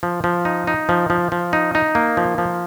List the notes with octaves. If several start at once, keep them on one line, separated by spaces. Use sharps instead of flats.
F3
F3
D#4
D#4
F3
F3
F3
D#4
D#4
A#3
F3
F3